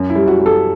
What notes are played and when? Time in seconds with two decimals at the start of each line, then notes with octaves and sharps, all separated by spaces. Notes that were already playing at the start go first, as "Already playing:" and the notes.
Already playing: F#2
0.10 E4
0.15 G3
0.28 F#4
0.40 G3
0.46 A4